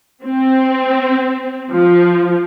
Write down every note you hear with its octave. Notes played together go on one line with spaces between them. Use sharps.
C4
F3